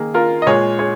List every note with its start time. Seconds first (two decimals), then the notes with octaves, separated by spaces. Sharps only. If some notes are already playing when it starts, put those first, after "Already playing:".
Already playing: D#3 A#3 G#4
0.14 F4 A#4
0.42 D#5
0.46 A#2 G#3 G#4 C#5
0.79 G#4 C#5